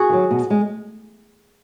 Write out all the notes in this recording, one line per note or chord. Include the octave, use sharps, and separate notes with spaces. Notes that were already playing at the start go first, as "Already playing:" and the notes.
Already playing: F#4 G#4
D#3 F#3
B2
G#3